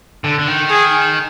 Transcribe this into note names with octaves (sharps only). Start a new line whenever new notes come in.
D3
D3
D#3
G#4